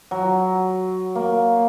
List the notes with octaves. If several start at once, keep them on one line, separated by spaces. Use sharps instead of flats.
F#3
A#3